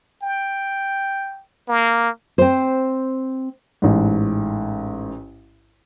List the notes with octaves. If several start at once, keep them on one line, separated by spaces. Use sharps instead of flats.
G5
A#3
C4 C5
A1 G#2